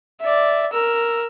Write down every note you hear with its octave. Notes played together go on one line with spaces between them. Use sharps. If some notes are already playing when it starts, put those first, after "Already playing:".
D5 E5
A#4 E6